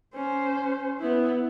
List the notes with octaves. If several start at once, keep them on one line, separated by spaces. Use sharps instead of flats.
C#4 C5
B3 E4